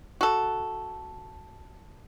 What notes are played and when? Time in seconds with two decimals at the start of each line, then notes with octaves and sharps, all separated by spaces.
0.21 F#4 A4